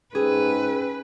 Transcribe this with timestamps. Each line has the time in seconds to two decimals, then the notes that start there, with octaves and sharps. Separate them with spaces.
0.15 G#2 C#4 G#4 B4 G5 E6